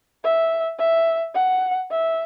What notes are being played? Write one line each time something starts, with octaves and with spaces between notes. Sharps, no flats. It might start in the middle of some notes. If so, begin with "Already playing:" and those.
E5
E5
F#5
E5